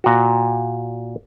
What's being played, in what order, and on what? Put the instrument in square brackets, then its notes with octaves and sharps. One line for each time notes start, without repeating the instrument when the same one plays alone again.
[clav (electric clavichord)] A#2 F#4